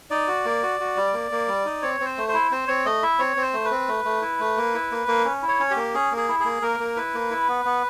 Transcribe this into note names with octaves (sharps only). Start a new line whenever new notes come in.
D#4 D5
F#4
A#3
F#4
F#4
G3
A#3
A#3
G3
D#4
C4 C#5
C4
C5
A3
C5
E4
C4 C5
C4 C#5
A3 D#5
E4 E5
C4 C#5
C4
C5
A3
B4
C4
A3
A3
E4
A3
A#3
E4
A#3
A#3
C#4
E4
C#5
C#4
G4
A#3
C#4 G#4
A#3
G#4
E4
A#3 G#4
A#3 A#4
A#3
E4 B4
A#3
E4
B3
B3